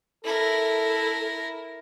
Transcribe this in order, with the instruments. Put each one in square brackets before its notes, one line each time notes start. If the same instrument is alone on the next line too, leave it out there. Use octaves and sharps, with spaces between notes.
[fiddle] E4 A#4 [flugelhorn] A4